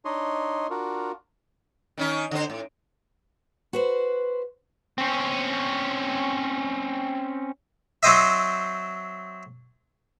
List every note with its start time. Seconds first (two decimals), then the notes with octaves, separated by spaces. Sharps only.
0.05 D4 D#4 C#5 D#5 C6
0.70 D4 F4 F#4 A#4
1.98 D#3 C#4 D#4
2.31 D3 C5
2.50 A2
3.73 F#4 B4 C5
4.98 C4 C#4
8.03 F#3 C4 C5 D#5 E5